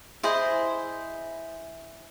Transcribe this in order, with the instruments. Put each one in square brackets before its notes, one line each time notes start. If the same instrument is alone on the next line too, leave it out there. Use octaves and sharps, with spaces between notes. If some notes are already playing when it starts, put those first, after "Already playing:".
[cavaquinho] E4 G#4 C5 D#5